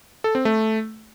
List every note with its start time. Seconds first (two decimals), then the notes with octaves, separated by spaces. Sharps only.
0.24 A4
0.35 C4
0.45 A3